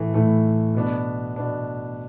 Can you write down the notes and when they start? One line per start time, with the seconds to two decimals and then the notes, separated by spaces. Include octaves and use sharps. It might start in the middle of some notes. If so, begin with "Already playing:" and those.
Already playing: A2 E3 A3
0.14 A2 E3 A3
0.75 B2 B3 D4
1.36 B2 B3 D4